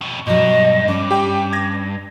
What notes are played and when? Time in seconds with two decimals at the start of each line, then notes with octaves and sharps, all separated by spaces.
0.01 F2 B2
0.27 G2 B2 F#3 D#5
0.88 C#4 D4 D6
1.11 G4 G5
1.53 G#6 A#6